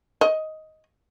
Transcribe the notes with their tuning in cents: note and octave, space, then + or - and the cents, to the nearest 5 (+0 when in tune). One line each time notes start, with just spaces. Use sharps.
D#5 +10